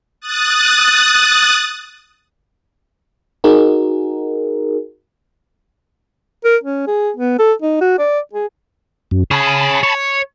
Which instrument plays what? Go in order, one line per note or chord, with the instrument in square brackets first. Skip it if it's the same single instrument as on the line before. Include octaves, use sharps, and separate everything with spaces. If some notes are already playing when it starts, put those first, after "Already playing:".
[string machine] D#6 F#6 A6
[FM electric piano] D#4 F#4 G#4 A#4
[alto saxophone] A#4
C#4
G#4
B3
A4
D#4
F#4
D5
G#4
[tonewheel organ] F#2
[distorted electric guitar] G#4 C#5 [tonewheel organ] A5 B5
[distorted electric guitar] C#5